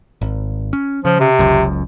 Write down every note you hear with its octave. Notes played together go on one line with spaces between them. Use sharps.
G#1
C#4
C#3 F3
C3
F#1 C#2 F#2